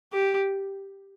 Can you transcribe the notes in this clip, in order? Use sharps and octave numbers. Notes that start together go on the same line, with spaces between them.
G4